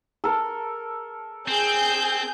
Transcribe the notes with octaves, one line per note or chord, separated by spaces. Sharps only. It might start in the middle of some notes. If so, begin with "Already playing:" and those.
A4 A#4
C4 G#4 G6